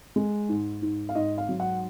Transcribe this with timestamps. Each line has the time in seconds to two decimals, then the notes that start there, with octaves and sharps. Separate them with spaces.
0.16 G#3
0.49 G#2
0.82 G#2
1.09 F5
1.15 G#2 D#5
1.38 F5
1.49 F#3
1.60 F#5